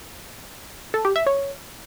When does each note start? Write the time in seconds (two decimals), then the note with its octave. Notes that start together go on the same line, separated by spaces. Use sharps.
0.94 A4
1.05 G4
1.16 E5
1.26 C#5